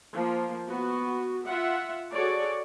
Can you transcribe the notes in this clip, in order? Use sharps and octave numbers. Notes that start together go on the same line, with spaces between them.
F3 A#3
B3 F#4
F4 E5 F#5
F#4 G#4 A4 C#5 D5